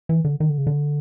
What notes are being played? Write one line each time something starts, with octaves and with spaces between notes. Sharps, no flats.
E3
D3
D#3
D3
C#3
D3